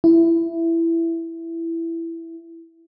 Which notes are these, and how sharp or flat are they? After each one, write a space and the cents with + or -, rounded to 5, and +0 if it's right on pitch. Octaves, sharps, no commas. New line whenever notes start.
E4 +10